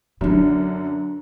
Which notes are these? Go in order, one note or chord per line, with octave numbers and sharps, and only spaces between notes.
F#2 D3 B3 D4